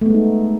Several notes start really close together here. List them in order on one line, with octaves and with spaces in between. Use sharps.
A3 B3 G#3 D#4